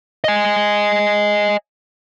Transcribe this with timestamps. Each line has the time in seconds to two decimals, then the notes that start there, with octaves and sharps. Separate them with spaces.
0.24 D#5 G#5